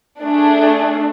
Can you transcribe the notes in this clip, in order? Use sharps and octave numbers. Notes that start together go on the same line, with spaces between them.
A3 D4 G#4